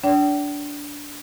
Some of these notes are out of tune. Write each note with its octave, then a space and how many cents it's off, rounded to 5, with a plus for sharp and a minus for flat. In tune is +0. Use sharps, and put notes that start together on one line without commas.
D4 -15 D5 -40 G5 -40